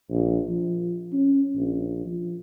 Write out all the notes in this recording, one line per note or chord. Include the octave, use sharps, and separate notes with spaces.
A#1
F3
C#4
A#1
F3